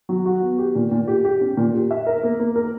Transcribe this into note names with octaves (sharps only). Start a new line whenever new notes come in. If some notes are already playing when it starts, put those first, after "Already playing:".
F#3
F#4
B3
G4
A#2
A#2
G4
G4
C#4
A#2
G4
E5
A#4
A#3
A#3
A#4